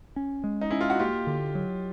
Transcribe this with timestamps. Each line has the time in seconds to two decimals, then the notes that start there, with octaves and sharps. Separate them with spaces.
0.16 C#4
0.44 G#3
0.61 D#4
0.70 C#4 E4
0.81 F4
0.90 F#4
0.99 A#3 F4 G4
1.27 D3
1.55 F#3